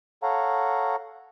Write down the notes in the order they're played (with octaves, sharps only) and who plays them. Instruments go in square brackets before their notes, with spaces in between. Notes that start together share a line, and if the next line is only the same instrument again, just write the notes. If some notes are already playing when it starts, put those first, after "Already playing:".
[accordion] A4 C#5 F5 F#5 A#5